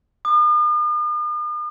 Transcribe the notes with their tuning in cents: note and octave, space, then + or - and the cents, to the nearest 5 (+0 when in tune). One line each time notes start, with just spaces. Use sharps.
D#6 -45